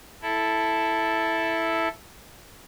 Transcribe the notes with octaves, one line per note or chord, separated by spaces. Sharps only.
E4 A4